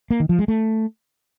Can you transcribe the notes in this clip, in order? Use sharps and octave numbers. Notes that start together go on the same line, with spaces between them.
A#3
D#3
F3
G#3
A3